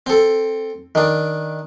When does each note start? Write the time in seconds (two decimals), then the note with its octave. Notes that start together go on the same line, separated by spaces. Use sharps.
0.06 C4 A4
0.95 D#3 D4